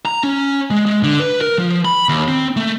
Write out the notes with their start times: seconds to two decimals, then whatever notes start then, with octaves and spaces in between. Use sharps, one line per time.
0.05 A#5
0.24 C#4
0.71 G#3
0.86 G#3
1.03 D3
1.20 B4
1.41 A#4
1.58 F3
1.85 B5
2.09 D#2
2.28 C4
2.56 A3